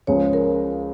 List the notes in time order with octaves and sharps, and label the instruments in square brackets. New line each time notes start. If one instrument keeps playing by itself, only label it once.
[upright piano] C#2 C#3 F3 G#3 [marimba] C#5
[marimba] A#4